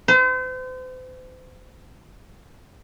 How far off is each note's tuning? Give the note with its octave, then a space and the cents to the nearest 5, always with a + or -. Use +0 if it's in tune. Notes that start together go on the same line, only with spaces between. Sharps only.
C5 -40